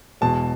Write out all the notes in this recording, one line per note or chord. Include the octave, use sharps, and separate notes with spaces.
E1 E2 B2 A5